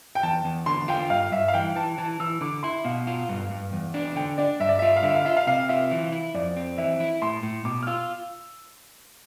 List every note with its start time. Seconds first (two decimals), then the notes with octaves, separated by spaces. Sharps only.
0.15 G5
0.23 E2 A5
0.45 E2
0.66 D3 C6
0.88 F4 G5
1.10 G2 F5
1.32 G2 E5
1.48 F5
1.54 E3 G5
1.75 E3 A5
1.98 E3 A5
2.20 E3 E6
2.41 D3 D6
2.63 E4 C6
2.85 B2 F5
3.07 F4
3.29 G2
3.51 G2
3.73 E2
3.94 D4
4.16 D3 G5
4.38 D4 D5
4.60 G2 E5
4.69 D5
4.79 F4 E5
4.96 F5
5.03 D3 E5
5.15 F5
5.25 F4 E5
5.37 F5
5.47 C3 F5
5.69 F4 E5
5.91 E3
6.12 E4
6.35 F2 D5
6.56 C4
6.78 E3 E5
7.00 E4
7.22 A2 C6
7.43 A2
7.65 B2 D6
7.83 F6
7.87 F4 E6